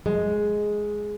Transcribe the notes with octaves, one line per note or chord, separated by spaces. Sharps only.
G#3